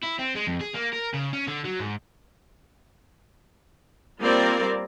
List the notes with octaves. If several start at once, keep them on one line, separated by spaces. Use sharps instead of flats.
E4
C4
G#3
F2
G#4
A#3
A#4
C#3
C#4
D3
F#3
G#2
G3 A#3 C4 F4 A#4 D5